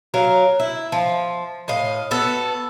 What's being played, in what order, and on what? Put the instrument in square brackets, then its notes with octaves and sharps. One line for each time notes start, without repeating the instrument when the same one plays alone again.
[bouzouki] F#3 A#4 F5
E4
F3
A2 D#5 F5
B3 F#4 A4